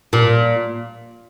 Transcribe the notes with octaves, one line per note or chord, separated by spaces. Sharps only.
A#2